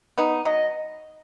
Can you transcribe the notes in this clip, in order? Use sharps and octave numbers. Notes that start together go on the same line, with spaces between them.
B3 D#4
F#3 D#5